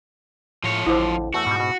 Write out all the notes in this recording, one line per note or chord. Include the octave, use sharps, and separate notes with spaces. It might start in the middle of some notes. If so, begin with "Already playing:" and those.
A2 F3 C#5
A1 F2 D3 E4 C5
E2 A3 F#4 E5 A5
G#2 B2 G3 D#6
B2